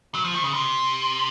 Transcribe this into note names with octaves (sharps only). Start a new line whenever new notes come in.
F#3
F3
D#3
C#3
C3